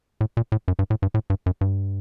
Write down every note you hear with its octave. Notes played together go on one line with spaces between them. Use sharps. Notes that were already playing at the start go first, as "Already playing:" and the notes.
A2
A#2
A2
F#2
G2
A2
G2
A2
G2
F#2
G2